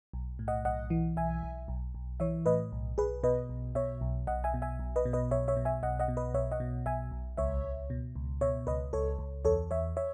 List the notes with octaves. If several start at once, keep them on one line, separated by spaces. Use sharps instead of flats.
B1
A2
D#5 F#5
B1 D#5 F#5
E3
B1 E5 G#5
B1
B1
B1
E3 C#5 E5
A2 B4 D#5
B1
B1 G#4 B4
B2 B4 D#5
B1
B2 C#5 E5
B1
B1 D#5 F#5
E5 G#5
B2
E5 G#5
B1
B4 D#5
B2
B4 D#5
B1 C#5 E5
C#5 E5
B2
E5 G#5
B1 D#5 F#5
D#5 F#5
B2
B4 D#5
B1 C#5 E5
D#5 F#5
B2
B1 E5 G#5
B1
C#2 C#5 E5
C#2
B2
C#2
B2 C#5 E5
C#2 B4 D#5
C#2 A4 C#5
C#2
E2 A4 C#5
E2 C#5 E5
C#5 E5